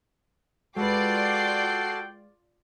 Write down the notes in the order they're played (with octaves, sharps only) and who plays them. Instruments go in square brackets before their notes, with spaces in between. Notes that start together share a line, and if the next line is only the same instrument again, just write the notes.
[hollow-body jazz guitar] G#3 B4 [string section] F4 D5 C7 [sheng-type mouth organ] F#4 A4 [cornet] G5